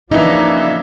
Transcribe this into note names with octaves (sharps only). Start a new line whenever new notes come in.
C#3 E3 F3 A#3 D4 D#4 E5